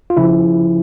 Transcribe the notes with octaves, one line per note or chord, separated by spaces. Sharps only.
F4
C#3 F3 E4